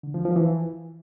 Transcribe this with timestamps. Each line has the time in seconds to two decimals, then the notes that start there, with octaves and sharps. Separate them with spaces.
0.03 D3
0.14 F3
0.25 F3
0.36 E3